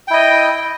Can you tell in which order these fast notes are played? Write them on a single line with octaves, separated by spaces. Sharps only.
G5 E4 D#5